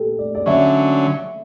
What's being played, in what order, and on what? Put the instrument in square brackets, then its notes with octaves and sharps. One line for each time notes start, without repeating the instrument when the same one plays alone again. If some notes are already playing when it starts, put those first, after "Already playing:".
Already playing: [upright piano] G4 A4
D5
D5
[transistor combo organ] D3 F#3 C#4 [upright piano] E5